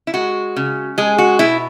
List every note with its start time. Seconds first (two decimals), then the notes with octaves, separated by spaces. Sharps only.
0.07 E4
0.14 G#3 F#4
0.56 C#3
0.98 G#3 G#4
1.18 F#4
1.39 B2 E4